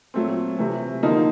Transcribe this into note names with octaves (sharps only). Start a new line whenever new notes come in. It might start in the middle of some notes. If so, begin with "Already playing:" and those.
A#2 F#3 A3 C4
C3 E3 A3
D3 F3 A#3 D#4